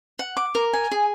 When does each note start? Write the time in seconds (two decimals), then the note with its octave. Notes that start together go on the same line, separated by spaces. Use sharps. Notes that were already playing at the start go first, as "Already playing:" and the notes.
0.19 F#5
0.37 D6
0.55 A#4
0.73 G#5
0.92 G#4